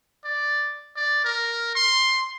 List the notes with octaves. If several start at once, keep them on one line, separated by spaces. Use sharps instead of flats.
D5
D5
A#4
C6